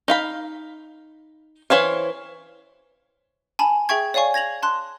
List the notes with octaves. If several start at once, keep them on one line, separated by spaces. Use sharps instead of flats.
D#4 F5 B5
E3 C5 C#5 F5
G#5 A5 B5
G#4 E5 G5 C#6 G#6
C#5 D5 F5 G#5 C#6
G#6 A#6 F7 F#7
A5 C6 F#6